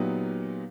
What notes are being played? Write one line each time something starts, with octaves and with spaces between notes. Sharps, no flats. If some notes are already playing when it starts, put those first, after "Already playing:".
Already playing: A#2 F#3 B3 D#4 G4